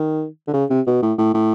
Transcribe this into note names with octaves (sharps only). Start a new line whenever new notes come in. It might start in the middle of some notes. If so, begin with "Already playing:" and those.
Already playing: D#3
D3
C#3
C3
B2
A2
A2
A2